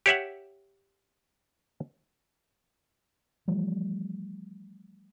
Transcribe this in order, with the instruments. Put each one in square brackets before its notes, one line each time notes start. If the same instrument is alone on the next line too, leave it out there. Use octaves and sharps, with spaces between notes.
[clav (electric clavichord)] G4 C#5 E5 F#5
[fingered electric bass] E3 F3 G3 A3